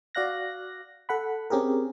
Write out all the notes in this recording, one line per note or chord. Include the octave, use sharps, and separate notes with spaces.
F#4 D5 F5 F#6 A#6
A4 F#5 B5
C4 C#4 G4 G#4 A#4